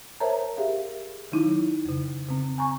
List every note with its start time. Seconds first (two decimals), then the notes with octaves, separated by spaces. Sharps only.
0.20 A#4 C5 C#5 E5 A5 A#5
0.57 G4 G#4 A#4 E5 F5
1.32 D#3 F#3 D#4 E4
1.85 F2 C#3
2.28 C#3 C4
2.58 G#5 A#5 C#6